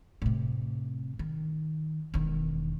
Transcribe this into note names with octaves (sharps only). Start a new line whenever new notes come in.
A2 C3
D#3
E1 D#3